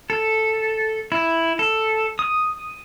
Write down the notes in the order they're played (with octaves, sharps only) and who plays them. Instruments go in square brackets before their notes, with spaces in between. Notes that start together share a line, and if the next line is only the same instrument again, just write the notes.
[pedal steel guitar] A4
E4
A4
D#6